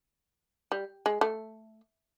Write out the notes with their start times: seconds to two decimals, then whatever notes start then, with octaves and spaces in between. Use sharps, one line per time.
0.72 G3
1.06 G#3
1.21 A3